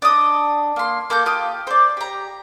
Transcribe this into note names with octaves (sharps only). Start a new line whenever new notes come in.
D4 D#5 D#6
A#3 C6
A#3 A4 C#6 G6
A#3 F4 G4 D#6
C5 D5
G4 A#5